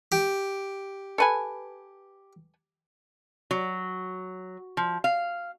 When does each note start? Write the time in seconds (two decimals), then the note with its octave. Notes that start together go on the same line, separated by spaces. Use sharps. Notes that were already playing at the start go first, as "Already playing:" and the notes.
0.12 G4
1.18 A4 B4 G#5
3.51 F#3
4.77 F3
5.04 F5